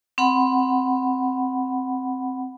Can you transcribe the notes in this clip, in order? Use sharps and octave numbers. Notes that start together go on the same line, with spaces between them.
C4 F#5 B5